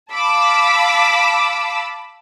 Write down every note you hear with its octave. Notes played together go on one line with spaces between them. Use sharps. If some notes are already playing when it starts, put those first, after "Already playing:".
F5 A5 B5 D6 E6